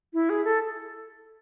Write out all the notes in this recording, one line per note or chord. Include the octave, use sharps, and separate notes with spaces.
E4
G#4
A4